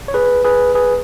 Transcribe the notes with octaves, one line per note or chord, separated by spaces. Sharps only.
C#5
G#4 B4
G#4 B4
G#4 B4